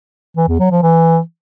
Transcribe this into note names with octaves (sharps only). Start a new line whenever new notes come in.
E3
E2
F#3
F3
E3